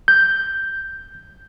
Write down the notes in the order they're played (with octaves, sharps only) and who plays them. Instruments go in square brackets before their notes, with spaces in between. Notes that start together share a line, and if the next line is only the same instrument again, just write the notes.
[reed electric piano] G6